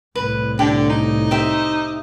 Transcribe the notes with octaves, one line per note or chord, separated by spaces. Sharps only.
C2 A2 B4
D3 G4
D#4
G4 C5 E5